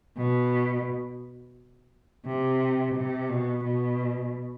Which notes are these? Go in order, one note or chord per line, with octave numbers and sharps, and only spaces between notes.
B2
C3
C3
B2
B2